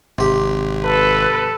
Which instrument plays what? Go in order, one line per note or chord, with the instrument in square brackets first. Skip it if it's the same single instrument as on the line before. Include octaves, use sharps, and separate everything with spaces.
[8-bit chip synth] G#1 [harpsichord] C3 G4
[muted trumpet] A4 [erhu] B4